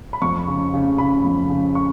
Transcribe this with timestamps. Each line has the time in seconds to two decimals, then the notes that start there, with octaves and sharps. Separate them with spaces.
0.13 B5
0.21 F2 C#6
0.47 C#3
0.74 C#3
0.98 C#3 B5
1.24 F2
1.49 C#3
1.75 C#6